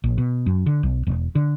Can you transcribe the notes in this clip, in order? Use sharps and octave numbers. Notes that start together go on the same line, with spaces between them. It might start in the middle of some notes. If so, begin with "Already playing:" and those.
A#1
B2
F#2
D3
B1
E1
D3